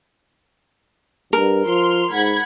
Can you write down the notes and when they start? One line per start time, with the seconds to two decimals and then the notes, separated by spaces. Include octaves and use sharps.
1.33 G2 A#4
1.67 F3 C6 F6
2.12 G#2 F#5 B5 G#6